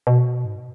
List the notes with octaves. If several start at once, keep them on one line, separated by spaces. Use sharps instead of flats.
B2
G#2